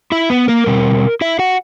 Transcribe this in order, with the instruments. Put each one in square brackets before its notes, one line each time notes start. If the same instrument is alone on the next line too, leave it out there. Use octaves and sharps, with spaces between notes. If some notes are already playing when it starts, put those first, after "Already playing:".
[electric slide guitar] E4 E5
B3 B4
A#3 A#4
B2 G3 C4
E4 E5
F#4 F#5